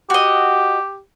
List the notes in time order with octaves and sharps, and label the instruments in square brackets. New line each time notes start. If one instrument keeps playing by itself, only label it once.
[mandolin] F#4 D#5 [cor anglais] G4